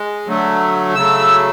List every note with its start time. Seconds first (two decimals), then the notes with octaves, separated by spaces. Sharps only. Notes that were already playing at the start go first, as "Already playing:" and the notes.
Already playing: G#3
0.27 D3 F#3 A3
0.95 C#3 F#3 A3 E6